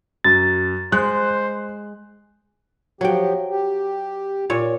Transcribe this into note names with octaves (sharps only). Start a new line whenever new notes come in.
F#2 A6
G#3 C5 F#6
F3 F#3 G4 G5
G4
A#2 C#5